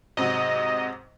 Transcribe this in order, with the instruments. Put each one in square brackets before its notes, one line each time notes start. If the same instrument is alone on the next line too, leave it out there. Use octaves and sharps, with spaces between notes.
[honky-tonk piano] G#2 C3 F#3 [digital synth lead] D#5